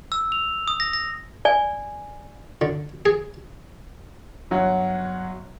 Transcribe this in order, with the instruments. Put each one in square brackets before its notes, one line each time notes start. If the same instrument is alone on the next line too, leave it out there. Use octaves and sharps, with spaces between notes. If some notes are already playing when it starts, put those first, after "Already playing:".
[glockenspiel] E6
F7
D#6
A#6
A#6
[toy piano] D5 G#5
[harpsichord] D3
G#4
[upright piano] G1 F#3 F#4 C#5 F#5